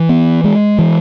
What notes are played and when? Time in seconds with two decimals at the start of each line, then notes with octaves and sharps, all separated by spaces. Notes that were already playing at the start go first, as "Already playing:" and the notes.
Already playing: E3
0.09 B3
0.44 G#3
0.79 E3